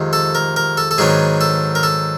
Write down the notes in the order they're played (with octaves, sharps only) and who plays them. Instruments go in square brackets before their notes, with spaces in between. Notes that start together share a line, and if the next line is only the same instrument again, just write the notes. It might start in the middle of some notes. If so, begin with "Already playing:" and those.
Already playing: [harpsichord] F2 C3 D#3 G#3
A4
A#4
A#4
A4
A4
G#2 D#3 F#3 B3 D4 G#4
A4
A#4
A4